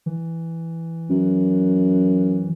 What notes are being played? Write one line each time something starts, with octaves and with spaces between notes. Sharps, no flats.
E3
F#2